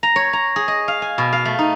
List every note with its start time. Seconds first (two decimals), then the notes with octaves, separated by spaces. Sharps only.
0.03 A#5
0.16 C#5
0.33 A#5
0.56 G#4
0.68 D#5
0.88 F5
1.02 G#5
1.18 B2
1.33 F5
1.45 A3
1.59 D#4